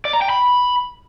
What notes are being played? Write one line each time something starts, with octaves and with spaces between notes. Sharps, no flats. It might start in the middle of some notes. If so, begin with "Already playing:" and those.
D5
A#5
G5
B5